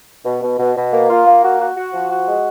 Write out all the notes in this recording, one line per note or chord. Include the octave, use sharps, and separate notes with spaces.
B2
B2
B2
B2
A#3
F4
A#3
F#4
F#4
F#4
F3
F#4
G#3